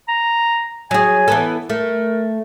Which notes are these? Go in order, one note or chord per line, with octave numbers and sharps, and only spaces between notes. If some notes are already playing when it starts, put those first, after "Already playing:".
A#5
F#3 G#4 G#5
E3 B3 A4
A3 A#4